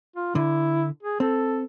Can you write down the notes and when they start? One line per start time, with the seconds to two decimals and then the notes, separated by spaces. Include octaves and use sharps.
0.16 F4
0.35 D3 E4
1.03 G#4
1.20 C4 A4